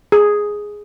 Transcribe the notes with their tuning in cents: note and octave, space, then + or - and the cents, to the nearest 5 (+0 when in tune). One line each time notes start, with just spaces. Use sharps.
G#4 +0